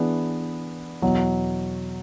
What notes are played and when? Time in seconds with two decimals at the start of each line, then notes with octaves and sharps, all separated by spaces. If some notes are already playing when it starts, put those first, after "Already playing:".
Already playing: E3 B3 D4 G#4
1.02 E2 B2 F#3